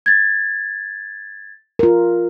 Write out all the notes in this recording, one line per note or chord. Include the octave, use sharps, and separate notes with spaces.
G#6 A6
F4 A#4